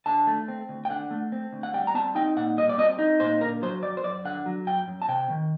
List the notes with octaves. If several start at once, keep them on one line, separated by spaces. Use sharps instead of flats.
D3 A5
A3
C4
D2
G5
D3 F#5
A3
C4
D2
F#5
G3 G5
A#5
C4 A5
D#4 G5
A#2 F#5
G3 D#5
D5
C4 D#5
D#4
A#2 C5
D3 A#4
F#3 C5
F#2 D5
C5
F#2 D5
D3 F#5
F#3
F#2 G5
F#2
A5
C3 G5
D#3